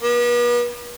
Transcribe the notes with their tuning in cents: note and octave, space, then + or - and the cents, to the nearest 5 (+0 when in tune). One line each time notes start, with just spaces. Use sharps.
B3 -40